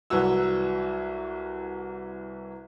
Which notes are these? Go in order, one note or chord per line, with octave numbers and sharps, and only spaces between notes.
C2 E3 F#3 F#4 E6